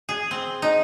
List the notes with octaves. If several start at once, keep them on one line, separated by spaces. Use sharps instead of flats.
G#4
C4
D#4